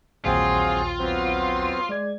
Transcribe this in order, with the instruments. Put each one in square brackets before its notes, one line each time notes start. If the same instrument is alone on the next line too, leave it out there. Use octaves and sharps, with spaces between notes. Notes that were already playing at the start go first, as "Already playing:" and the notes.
[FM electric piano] A#1 D#2 G5 [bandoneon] F#3 C4 G#4 [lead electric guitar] F4
[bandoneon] F#3 B3 C4
[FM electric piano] G#3 D5 G#6